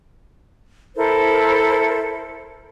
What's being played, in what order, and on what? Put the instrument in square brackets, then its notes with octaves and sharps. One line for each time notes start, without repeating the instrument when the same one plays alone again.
[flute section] E4 A4 A#4 C5